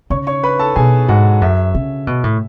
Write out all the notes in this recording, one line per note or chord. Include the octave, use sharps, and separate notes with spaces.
C#3 C#5 C#6
C#5 C#6
B4 B5
A4 A5
B2 G#4 G#5
G#2 F#4 F#5
F#2 E5
C#3
B2
A2